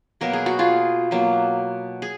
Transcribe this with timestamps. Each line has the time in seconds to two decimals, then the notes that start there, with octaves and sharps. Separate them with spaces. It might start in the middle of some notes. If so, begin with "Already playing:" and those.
0.21 B2 F#3 A#3 A#4
0.33 G#4
0.46 F#4
0.59 F4 G#4
1.11 B2 F#3 A#3
2.02 G#4